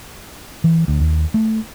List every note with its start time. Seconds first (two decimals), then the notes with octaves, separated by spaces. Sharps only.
0.64 E3
0.88 D2
1.00 D#2
1.34 A3